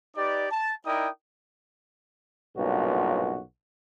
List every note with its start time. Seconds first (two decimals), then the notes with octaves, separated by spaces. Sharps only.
0.16 D#4 G4 B4 D5
0.51 A5
0.86 D#4 E4 A#4 D5 G5 D#6
2.57 B1 G2 A#2 C#3 F#4